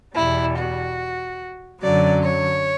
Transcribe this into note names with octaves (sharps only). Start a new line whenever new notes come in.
E2 B2 G3 E4
F#4
F#2 D3 F#3 D5
C#5